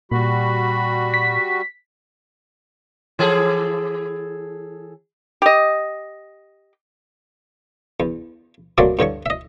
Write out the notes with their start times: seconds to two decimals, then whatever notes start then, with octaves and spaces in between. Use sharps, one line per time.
0.12 A#2 G3 F#4 B5
1.14 B6
3.19 E3 G#4 A4
5.42 G4 D#5
8.00 E2
8.78 F#3 A3 A#3 C4 F#4 D5
8.99 G2 D3 C#5 C#6
9.26 D#5 E5